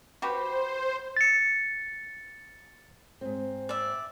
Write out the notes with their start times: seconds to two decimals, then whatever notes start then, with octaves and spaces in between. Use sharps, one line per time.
0.22 F#4 G4 B4 C5
1.17 A6 C#7
3.21 G#2 C4
3.69 D5 E5